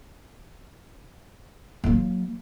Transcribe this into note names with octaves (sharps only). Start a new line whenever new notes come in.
F#3 A#3